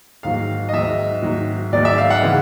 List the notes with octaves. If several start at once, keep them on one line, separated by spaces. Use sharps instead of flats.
G#2 D#3 F#3 F5
D#5
G#2 D#3 F#3 E5
G#2 D#3 F#3
G#2 D#3 F#3 D5
E5
F5
F#5
C#3 E3 G#3